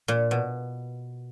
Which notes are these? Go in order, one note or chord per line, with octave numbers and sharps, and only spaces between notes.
A#2
B2